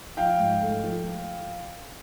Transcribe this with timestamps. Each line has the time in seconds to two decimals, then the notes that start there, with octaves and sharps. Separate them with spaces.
0.17 F3 F5 G5
0.39 G#2
0.62 A3
0.84 F3